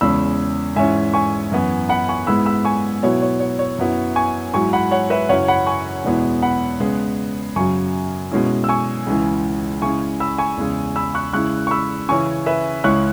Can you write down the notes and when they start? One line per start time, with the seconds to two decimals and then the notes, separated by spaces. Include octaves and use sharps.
0.01 E2 C#3 G#3 C#4 B5 E6
0.76 G#2 E3 C#4 E5 G#5
1.14 G#5 C#6
1.52 F#2 E3 B3 E4
1.89 F#5 B5
2.09 G#5 C#6
2.27 G#2 G#3 B3 E4 B5 E6
2.46 B5 E6
2.65 G#5 C#6
3.03 B2 F#3 B3 E4 C#5
3.22 C#5
3.40 C#5
3.59 C#5
3.78 F#2 F#3 B3 E4
4.16 G#5 C#6
4.54 G#2 F#3 E4 G#5 C#6
4.73 F#5 B5
4.91 C#5 F#5
5.10 B4 E5
5.29 F#2 C#3 F#3 C#4 E4 C#5 F#5
5.48 F#5 B5
5.67 G#5 C#6
6.04 E2 B2 G#3 B3 E4
6.42 F#5 B5
6.80 C#3 G#3 B3
7.56 F#2 C#3 F#3 G#5 C#6
8.32 B2 G#3 C#4 E4
8.64 E6
8.69 G#5 C#6
9.07 C#2 C#3 E3 G#3
9.82 C#3 G#3 E4 G#5 C#6
10.20 B5 E6
10.38 G#5 C#6
10.57 E2 C#3 G#3
10.96 B5 E6
11.15 C#6 F#6
11.33 C#3 G#3 E4 C#6 F#6
11.67 C#6
11.71 B5 E6
12.09 C#3 E3 C#4 E4 G#5 C#6
12.46 B4 E5
12.84 C#2 C#3 G#3 C#4 E4 C#6 F#6